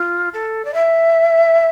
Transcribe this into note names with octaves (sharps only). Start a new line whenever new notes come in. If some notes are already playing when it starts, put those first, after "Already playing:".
Already playing: F4
A4
D5
E5